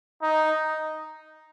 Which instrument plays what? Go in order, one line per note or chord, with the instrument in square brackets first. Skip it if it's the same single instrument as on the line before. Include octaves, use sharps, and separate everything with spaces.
[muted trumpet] D#4